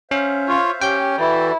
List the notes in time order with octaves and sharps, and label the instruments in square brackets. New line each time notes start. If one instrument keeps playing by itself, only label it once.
[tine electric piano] C#4 [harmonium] C5 E5 F5
[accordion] F4 [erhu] C#5
[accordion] C#4 [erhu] G4 [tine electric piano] G5 G6
[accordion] E3 [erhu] E4 [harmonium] F#4 A4 D5